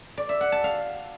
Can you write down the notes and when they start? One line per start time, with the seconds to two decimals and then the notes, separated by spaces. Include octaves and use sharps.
0.18 D5
0.29 E5
0.41 F#5
0.52 A5
0.64 F5